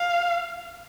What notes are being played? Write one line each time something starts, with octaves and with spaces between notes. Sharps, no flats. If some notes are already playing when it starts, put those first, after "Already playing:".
Already playing: F5